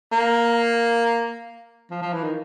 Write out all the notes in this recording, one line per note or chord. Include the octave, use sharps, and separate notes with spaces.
A#3
F3
F3
E3
D#3